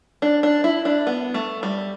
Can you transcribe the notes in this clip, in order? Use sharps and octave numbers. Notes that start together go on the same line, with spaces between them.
D4
D4
E4
D4
B3
A3
G3